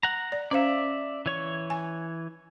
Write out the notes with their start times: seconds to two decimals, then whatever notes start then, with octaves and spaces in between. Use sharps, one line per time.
0.03 F#5 A#5
0.32 D5
0.51 C#4 C5 D5 E5 F5
1.26 E3 C#5 C#6
1.70 G#5